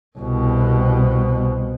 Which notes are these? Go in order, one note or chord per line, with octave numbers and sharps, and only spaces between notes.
C2 B2